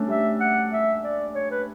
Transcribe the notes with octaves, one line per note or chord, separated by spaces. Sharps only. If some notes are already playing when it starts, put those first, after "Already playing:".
Already playing: A3 C#4 D4
G3 E5
F#5
E5
D5
C#5
B4